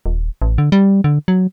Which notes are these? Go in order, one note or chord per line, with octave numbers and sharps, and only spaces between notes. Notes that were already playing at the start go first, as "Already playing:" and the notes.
D#1
A1
D3
G3
D3
F#3